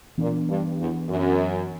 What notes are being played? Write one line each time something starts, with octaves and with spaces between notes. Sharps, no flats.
A#2 E3 B3 D4
G2
E2
F#2